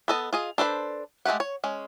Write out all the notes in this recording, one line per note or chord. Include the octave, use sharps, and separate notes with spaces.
B3 A4 D#5
F4 G#4 D#5
D4 A4 B4 C5
G#3 A3 F4 G4 F#5
C#5
G#3 C#4